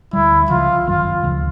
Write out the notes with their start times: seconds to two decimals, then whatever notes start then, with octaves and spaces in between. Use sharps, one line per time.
0.13 D2 D3 G3 E4
0.50 C#2 C#3 F3 F4
0.87 G1 F#2 D#3 F#3 F4
1.23 D2 C#3 F3